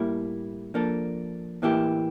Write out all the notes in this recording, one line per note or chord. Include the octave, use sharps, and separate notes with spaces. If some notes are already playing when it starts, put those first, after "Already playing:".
Already playing: A2 G3 A#3 E4
F3 A#3 D4 A4
A2 E3 A#3 E4 G4